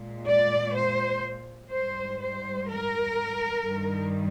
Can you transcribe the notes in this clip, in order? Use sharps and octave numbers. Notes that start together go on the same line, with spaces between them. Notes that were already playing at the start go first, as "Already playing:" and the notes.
Already playing: A#2 G#3
D5
C5
G#2 G3 C5
C5
A#4
G2 D#3 G3